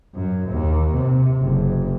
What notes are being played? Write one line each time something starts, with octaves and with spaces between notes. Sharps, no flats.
F#2
D#2
C3
F#1